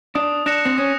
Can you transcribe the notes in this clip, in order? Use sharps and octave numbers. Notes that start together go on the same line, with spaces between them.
D4 D#6
D4 F#6 A#6 C#7 E7
C4
C#4 D#6